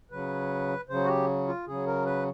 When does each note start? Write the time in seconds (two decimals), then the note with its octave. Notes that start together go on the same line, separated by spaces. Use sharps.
0.11 C#3 F#3 B4
0.89 C#3 F#3 C5
1.04 F#4
1.08 G4
1.48 F4
1.67 C#3 F#3 G#4
1.87 A#4
2.06 B4